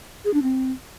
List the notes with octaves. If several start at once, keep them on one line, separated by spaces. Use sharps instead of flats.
G#4
D4
C4